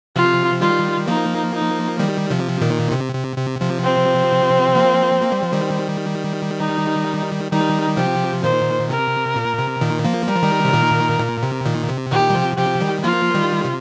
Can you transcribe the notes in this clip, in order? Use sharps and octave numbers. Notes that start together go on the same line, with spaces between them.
C3 F3 F4
D#3 G3 F4
F3 A#3 D#4
D#4
D#3 G3
C3 F3
A#2 D#3
C3
C3
C3
C3 F3
C4
F3 A#3
A#3
G3
F3
D#3 G3
D#4
D#3 G3 D#4
C3 F3 G4
A#2 D#3 C5
C3 A#4
A#2
C3
A#2 D#3
F3 A#3
G3 A#4
F3
D#3 G3
C3
A#2 D#3
A#2
C3
A#2 D#3
C3
A#2 D#3 G4
G3
C3 F3
C3 F3 G4
D#3 G3
F3 A#3 F4
D#3 G3
C3